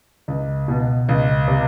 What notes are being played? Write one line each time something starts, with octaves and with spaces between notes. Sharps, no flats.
C#2
B2
C#2
C3